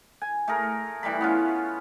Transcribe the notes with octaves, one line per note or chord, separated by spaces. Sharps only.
G#5
A3 G#4 A#4
E3 G3 A3 B5
B3 C#4 F4